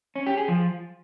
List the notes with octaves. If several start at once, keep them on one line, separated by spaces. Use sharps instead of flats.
C#4
G4
G#4
F3